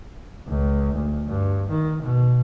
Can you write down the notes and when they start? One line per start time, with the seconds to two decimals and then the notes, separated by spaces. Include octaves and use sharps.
0.47 C#2
0.95 D2
1.28 G2
1.69 D#3
2.03 B2